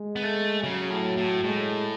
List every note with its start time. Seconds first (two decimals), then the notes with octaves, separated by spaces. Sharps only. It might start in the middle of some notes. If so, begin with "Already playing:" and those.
Already playing: G#3
0.16 B3
0.23 A3
0.64 C#3 F#3
0.90 A2
1.17 A2
1.44 A2 G#3